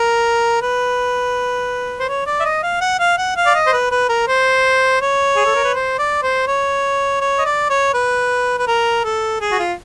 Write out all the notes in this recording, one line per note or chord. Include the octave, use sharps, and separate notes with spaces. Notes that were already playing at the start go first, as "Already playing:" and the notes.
Already playing: A#4
B4
C5
C#5
D5
E5
D#5
F5
F#5
F5
F#5
F5
D5
D#5
C5
B4
B4
A#4
C5
C#5
G#4
A4
A#4
B4
C5
D5
C5
C#5
C#5
D#5
D5
C#5
B4
B4
A#4
A4
G#4
F#4
F4